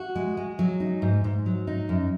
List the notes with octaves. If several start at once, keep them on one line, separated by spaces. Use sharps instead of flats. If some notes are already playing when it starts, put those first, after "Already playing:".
Already playing: F#4
G#3
G#3
F#3
D#4
G#2
G#2
F#3
D#4
F#2